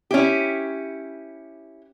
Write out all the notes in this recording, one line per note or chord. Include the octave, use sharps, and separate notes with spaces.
C#4 E4 G4